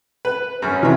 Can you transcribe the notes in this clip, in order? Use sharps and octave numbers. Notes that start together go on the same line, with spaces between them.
B4
F#2 C#4
C3 E3 F#3 E4